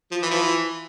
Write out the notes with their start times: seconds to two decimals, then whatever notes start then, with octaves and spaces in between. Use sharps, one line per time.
0.11 F3
0.23 E3
0.30 F3
0.34 E3